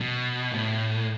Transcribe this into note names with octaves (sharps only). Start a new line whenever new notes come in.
B2
A2